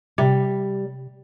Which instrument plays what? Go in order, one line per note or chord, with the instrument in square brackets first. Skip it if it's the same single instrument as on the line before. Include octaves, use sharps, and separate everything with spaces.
[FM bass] C3 [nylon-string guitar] G3